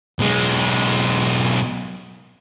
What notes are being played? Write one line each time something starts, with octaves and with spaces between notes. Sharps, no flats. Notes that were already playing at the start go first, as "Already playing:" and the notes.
B1 G#3